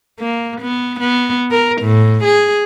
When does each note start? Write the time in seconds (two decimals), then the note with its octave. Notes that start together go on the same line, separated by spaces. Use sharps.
0.19 A#3
0.61 B3
1.00 B3
1.51 A#4
1.82 A2
2.24 G#4